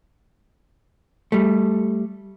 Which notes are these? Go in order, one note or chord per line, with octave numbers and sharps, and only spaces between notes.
G3 A3